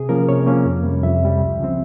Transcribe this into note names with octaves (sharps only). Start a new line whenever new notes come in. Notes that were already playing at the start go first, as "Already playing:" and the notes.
Already playing: C3 G#4
F3 A#3 C#4 A#4
C3 C#5
F3 A#3 C#4
F2
C3 G3
F2 E5
C3 G3
C#2
C#3 F3 C4